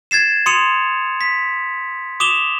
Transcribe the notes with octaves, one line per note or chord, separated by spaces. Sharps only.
G#6 A6 C7 E7
C6 D#6 C#7 D#7 F7
B6
D6 D#6 E7 F7 G7